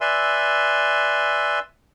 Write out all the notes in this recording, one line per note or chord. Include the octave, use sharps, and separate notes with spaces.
B4 D5 E5 G#5 C6 E6